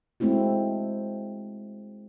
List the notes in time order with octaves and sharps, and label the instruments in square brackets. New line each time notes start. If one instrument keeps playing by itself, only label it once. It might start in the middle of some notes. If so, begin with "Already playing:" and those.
[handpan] G#3 A3 C4 E4 F#4